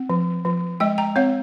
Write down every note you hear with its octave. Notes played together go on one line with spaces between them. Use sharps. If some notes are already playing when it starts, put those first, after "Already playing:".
Already playing: C4
F3
F3
G#3 D#5 G5
G5 A#5
C4 C#5 F5